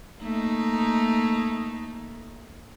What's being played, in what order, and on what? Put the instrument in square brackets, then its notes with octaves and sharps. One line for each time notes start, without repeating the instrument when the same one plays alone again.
[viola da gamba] A3 A#3 D#4